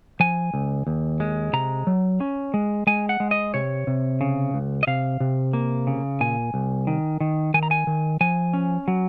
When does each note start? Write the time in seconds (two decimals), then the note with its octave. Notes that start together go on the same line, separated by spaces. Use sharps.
0.20 F3 G#5
0.54 C#2
0.87 D#2
1.20 G#3
1.53 C3 A#5
1.87 F#3
2.21 C#4
2.54 G#3
2.87 G#3 G#5
3.09 F#5
3.20 G#3
3.31 D#5
3.54 C3 C#5
3.87 C3
4.21 C#3
4.54 C#2
4.83 D#5
4.87 C3 F5
5.20 C3
5.53 A#3
5.87 C#3
6.21 A#2 G#5
6.54 C2
6.87 D#3
7.20 D#3
7.54 D#3 G#5
7.63 A#5
7.71 G#5
7.87 D#3
8.21 F3 G#5
8.54 C#4
8.88 F#3